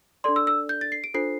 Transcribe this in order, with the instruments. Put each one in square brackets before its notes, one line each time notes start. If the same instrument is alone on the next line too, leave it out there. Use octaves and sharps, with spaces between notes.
[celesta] D4 A4 D5 C6
E6
E6
G6
A6
C7
D7
D4 F4 A4 C5 C7